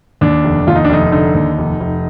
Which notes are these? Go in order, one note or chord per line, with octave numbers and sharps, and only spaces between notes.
D#2 D4
F1
D#2 F4
D#4
D4
F1 D#4
D3 D#4
D#2
F1
F1